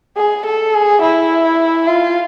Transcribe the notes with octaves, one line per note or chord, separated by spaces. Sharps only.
G#4
A4
G#4
E4
F4